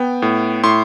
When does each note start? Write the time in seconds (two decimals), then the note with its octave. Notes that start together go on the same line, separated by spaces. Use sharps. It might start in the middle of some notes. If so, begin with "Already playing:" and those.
Already playing: B3 G5
0.22 A2
0.64 A2 C6